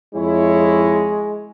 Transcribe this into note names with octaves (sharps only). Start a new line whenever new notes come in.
F2 G#3 E4 C#5